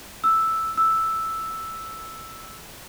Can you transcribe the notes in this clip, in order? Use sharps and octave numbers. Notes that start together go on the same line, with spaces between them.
E6
E6